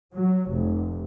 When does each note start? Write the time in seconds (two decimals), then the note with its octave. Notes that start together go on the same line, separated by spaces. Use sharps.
0.14 F#3
0.50 F1